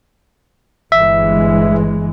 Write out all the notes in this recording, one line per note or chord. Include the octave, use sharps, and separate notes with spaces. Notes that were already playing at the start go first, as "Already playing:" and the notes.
G1 E3 G#3 E5